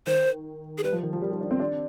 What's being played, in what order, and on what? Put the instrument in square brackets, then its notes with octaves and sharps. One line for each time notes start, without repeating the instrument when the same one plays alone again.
[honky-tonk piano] D#3 [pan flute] C5
[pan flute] G#4
[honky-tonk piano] G3 [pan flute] B4
[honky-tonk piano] F3
D#3
F3
G3
G3
D4
C4
D4